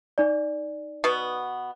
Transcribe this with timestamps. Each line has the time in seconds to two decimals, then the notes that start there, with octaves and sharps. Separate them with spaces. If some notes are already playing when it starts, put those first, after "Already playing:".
0.18 D#4 D5
1.04 B2 B3